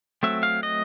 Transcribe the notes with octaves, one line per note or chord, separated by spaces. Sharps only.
F#3 A3 C4 E5
F5
D#5